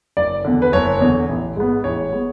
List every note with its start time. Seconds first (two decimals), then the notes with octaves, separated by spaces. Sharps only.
0.17 F#1 D5
0.45 E2 D3
0.62 B4
0.72 F#1 C#5
1.01 E2 D3
1.29 A1
1.56 G#2 G#3 B3
1.84 A1 C#5
2.12 G#3 B3